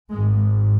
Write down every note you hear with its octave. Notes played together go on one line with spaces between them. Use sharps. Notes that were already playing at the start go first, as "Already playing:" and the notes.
G#1 G#2 G#3